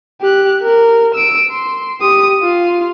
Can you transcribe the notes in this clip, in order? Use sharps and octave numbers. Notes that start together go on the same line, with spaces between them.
G4 F#6
A#4
E6 D7
C6
G4 D#6
F4